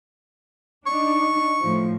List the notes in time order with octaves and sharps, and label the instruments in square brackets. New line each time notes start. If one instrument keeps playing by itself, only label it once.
[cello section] D4 D#4 [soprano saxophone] C#6
[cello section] A2 F3